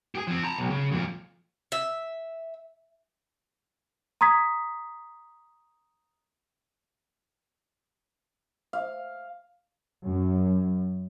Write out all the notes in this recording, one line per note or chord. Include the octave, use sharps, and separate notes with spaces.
G4 G#4
F3 C4
A5 A#5
B1
C#3
F2 A#2
E5
A#5 C6 D#6 G#6 B6
F5
F#2